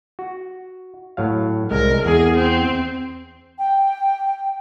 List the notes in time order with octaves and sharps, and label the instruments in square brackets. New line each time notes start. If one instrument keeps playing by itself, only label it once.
[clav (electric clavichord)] F#4
A2 F#3 F5
[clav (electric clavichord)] C2 G#3 [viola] A#4
[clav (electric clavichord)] E2 [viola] G#4
[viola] C4
[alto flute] G5